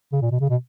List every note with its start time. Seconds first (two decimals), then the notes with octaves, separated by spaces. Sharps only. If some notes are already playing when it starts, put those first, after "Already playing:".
0.12 C#3
0.21 A#2
0.31 B2
0.40 C#3
0.50 B2